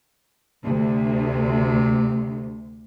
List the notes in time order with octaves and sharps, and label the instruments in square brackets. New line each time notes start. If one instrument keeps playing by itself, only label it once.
[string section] D2 [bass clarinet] C3